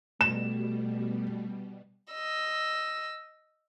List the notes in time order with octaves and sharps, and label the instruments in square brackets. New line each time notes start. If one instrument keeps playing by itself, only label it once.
[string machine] B2 G3 [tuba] A3 [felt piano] E7
[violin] D#5 E6